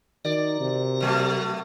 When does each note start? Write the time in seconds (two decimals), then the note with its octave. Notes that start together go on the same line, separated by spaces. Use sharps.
0.25 D#3 F#4 A#4 D5 A#5
0.61 C3
1.00 B2 F#3 A3